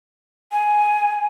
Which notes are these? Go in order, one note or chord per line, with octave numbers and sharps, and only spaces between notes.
G#5